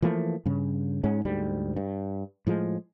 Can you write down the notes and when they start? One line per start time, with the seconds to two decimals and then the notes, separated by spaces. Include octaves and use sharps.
0.02 E3 F3 A3 A#3
0.46 G2 C#3
1.03 G#2 G#3 C#4
1.25 D2 G#2 G3
1.76 G2
2.47 A2 F3 G#3